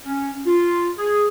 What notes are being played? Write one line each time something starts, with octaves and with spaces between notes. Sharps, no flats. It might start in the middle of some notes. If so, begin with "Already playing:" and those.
C#4
F4
G#4